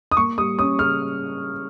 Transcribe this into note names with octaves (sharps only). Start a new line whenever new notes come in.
D#6
A#3 C#6
G3 D#6
C#4 D#6
C#3 F6